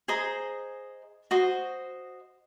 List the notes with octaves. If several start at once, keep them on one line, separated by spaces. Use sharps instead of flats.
G#4 C5 D#5 A#5
F#4 C5 D#5